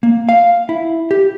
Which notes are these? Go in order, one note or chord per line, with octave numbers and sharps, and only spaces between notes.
A#3
F5
E4
G4